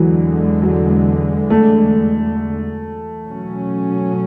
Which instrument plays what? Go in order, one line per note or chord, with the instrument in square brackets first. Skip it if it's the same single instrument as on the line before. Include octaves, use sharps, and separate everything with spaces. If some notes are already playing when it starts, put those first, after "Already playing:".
Already playing: [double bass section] E2 D3 G#3 [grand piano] E3 F#3
[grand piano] F#3
A3
[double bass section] B2 F#3 C#4